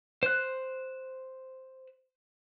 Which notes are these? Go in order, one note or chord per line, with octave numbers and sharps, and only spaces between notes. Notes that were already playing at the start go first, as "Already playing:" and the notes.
C5 F#6